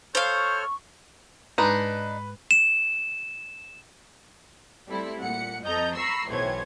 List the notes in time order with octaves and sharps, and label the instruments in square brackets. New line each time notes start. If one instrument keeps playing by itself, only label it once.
[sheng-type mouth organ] A4 C#5 F6 [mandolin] C5 F5 [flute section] C#6 [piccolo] G6
[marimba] G#2 G#3 [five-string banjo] D4 D#4 [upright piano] B4
[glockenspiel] E7
[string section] G3 A3 C4 E4
A#2 F#5 C#7
F2 A4 D#5 A#5 G6
A#5 B5 C#6 E6 C7
B1 A2 E3 C5 C#5 G#6